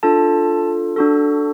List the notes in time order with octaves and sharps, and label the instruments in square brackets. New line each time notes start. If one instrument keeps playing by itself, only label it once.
[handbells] D4 F4 A4 A5
D4 F#4 A4